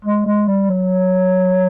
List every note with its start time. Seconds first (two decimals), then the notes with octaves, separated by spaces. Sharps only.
0.05 G#3
0.26 G#3
0.48 G3
0.70 F#3